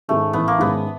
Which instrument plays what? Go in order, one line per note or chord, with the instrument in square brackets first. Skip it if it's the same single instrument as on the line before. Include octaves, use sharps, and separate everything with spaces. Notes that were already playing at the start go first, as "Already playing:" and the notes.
[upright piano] G#2 D#3 G#3 C#4 [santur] A3
[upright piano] A1 [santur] B3
[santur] A#3
[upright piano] G#2 D#3 G#3 C#4 [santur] B3